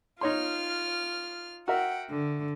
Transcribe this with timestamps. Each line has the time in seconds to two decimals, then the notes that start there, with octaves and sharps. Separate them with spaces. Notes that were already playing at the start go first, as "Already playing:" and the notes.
0.21 D#4 F4 C#5 C6 F6
1.68 F#4 A#4 E5 F#5 G5
2.10 D3